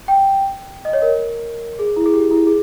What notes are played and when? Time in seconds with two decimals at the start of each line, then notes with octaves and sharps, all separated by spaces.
0.08 G5
0.85 D#5
0.93 C#5
1.02 A#4
1.79 G#4
1.96 E4
2.06 G#4
2.14 G4
2.31 E4
2.47 G#4